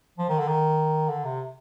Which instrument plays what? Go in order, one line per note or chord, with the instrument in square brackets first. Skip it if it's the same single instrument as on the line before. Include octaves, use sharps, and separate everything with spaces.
[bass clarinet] F3
D#3
D3
D#3
D3
C3